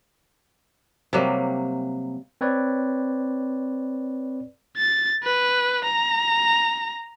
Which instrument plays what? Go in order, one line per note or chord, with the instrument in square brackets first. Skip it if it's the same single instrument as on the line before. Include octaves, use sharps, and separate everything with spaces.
[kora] C3 F#3 G3 A#3
[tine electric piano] C4 B4 C#5 D5
[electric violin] A6
B4
A#5